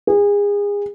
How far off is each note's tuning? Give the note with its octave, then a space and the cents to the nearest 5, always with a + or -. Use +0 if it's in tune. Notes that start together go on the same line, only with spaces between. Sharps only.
G#4 -30